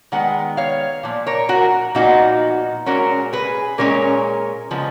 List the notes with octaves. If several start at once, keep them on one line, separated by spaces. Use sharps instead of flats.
D#3 G#3 B3 F#5
C#5 F5
A#2 F3
A#4 C#5
F#4 A#4
A#2 F3 B3 D#4 F#4
A#2 G#3 C#4 F#4 A#4
G#4 B4
A#2 G#3 C#4 A#4 C#5
C#3 F3 G#3 B3